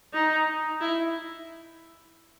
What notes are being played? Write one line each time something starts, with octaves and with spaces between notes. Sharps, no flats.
D#4
E4